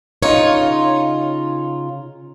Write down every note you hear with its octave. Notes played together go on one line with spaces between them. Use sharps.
C#3 D#4 F4 C#5